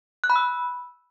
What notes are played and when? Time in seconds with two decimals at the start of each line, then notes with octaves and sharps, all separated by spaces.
0.24 F#6
0.30 B5
0.36 E6